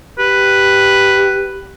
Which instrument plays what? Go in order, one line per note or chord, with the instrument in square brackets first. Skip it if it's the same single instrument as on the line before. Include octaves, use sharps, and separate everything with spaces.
[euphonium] G4 [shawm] B4